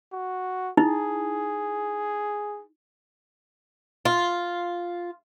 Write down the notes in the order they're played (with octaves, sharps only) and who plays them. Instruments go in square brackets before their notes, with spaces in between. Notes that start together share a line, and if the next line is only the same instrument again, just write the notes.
[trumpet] F#4
[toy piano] D#4 E4 [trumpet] G#4
[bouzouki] F4